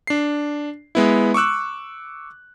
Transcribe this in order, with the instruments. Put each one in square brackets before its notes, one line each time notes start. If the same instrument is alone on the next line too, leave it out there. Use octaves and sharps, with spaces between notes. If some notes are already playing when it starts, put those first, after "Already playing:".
[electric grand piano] D4 C7
G#3 B3 E4
C#6 D6 E6 F#6